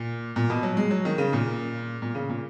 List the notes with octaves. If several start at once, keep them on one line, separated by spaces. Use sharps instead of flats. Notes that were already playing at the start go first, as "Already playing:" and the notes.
Already playing: A#2
A#2
B2
F#3
G#3
F#3
D#3
C#3
A#2
A#2
C#3
A#2